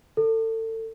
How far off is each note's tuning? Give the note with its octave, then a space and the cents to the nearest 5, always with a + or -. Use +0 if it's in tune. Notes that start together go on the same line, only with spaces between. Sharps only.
A4 +30